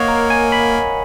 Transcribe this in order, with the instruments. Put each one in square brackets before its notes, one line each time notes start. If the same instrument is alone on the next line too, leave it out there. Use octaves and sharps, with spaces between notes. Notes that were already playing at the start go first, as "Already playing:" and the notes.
Already playing: [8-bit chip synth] A#3 [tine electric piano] C#5 D#5 F5 F#5
[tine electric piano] A#4
G#5
B5